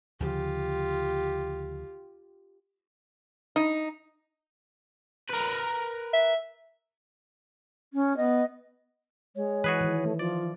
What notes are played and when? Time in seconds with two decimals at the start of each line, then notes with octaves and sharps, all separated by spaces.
0.20 D2 C#3 F3 F4 G4
3.56 D#4
5.29 A#4 B4
6.13 E5
7.93 C#4
8.16 B3 D#5
9.36 G#3 C#5
9.64 E3 F#4 G#4 B4
9.80 D#3 E3
10.03 A3
10.19 F3 F4 D5